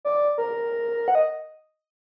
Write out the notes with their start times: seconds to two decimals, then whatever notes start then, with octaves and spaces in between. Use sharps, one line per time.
0.05 D5
0.38 A#4
1.08 F#5
1.15 D#5